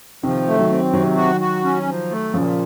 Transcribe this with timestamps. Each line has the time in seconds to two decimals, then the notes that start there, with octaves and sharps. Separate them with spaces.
0.23 C3 D#3 F3
0.48 A3
0.59 D#3 F#3
0.70 C4
0.93 C3 D#3 F#3
1.17 F#4
1.41 F#4
1.64 C#4
1.87 F3
2.11 A3
2.34 A#2 C#3 F3